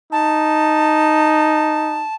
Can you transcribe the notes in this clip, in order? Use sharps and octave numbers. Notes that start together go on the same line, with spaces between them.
D#4 A5